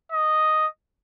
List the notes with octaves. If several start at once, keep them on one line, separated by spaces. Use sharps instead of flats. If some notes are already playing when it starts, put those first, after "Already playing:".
D#5